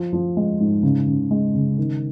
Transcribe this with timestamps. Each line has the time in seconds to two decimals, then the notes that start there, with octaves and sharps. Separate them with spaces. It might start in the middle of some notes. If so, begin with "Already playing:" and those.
Already playing: F3
0.13 F3
0.37 G#3
0.60 G#2
0.83 C#3
1.08 C#3
1.31 G#3
1.55 C#3
1.78 D#3